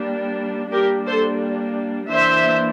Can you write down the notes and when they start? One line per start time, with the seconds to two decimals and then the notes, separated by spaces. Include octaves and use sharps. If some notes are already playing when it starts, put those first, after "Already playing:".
Already playing: G3 A#3 D4
0.72 G3 A#3 D4 G4 A#4
1.06 A4 C5
2.10 E3 A#3 D4 C5 E5